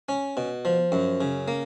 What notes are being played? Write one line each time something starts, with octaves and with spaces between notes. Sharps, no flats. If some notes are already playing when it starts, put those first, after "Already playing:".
C#4
B2
F3
F#2
C#3
A#3